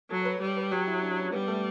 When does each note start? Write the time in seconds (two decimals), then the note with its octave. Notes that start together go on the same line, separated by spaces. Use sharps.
0.10 F#3 A4
0.21 C#5
0.25 B4
0.42 G3 C#5
0.57 B4
0.71 F#3 G4
0.87 E4
1.02 D4
1.18 C#4
1.32 G3 B3
1.48 A3